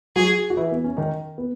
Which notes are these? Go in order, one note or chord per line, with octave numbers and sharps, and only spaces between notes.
F#3 F#4 G#4
F#4
E3 E4
B3
C#4
D#3 D#4
B3